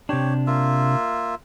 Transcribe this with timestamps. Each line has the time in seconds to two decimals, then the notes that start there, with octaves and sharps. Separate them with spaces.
0.09 C3 D4 G4 C#5
0.47 A#3 F4 E5